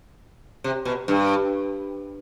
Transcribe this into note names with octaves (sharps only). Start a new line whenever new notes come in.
C3
B2
G2